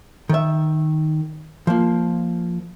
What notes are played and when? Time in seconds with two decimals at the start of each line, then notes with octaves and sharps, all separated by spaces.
0.29 D#3 E5
1.67 F3 A#3